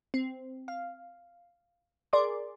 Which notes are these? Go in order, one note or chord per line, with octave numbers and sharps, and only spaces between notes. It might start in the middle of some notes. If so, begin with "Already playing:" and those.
C4
F5
G#4 A#4 D5 C6 D6